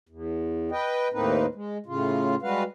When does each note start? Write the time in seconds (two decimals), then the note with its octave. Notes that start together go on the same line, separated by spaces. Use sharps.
0.09 E2
0.71 B4 D#5 G5
1.13 D#2 A2 A#3 C4 D#4 B4
1.55 G#3
1.86 A2 C#3 F4
2.42 G3 G#3 F#4 B4 F5